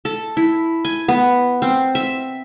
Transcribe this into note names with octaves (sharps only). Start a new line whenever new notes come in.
A4
E4
G#5
B3
C4
E5